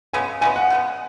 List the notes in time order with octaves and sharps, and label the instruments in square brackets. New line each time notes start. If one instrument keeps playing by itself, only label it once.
[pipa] C#3 G#3 B3 [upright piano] G#5
[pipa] C#3 G#3 B3 [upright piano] G#5
[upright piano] F#5
[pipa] C#3 G#3 B3